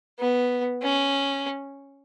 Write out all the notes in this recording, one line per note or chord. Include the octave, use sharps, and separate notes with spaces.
B3
C#4